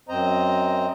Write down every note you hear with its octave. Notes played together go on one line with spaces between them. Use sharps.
F#2 C4 C5 D#5 A#5